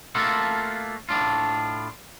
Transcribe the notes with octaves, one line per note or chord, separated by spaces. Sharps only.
A3 A#3 F4 F#4 A4
A2 D4 F4